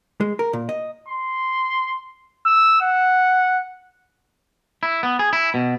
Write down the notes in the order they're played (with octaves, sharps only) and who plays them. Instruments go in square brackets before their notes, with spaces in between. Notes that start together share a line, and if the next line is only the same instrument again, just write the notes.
[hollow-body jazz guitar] G#3
A#4
A#2
D#5
[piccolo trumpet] C6
E6
F#5
[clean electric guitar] E4
B3
G#4
E4
B2